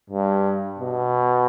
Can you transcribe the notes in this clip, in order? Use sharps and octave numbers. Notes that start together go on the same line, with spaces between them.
G2
B2